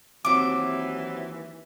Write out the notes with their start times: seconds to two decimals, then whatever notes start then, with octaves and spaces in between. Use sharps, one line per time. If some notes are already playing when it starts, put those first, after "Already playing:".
0.25 D#2 C3 E3 F#3 D6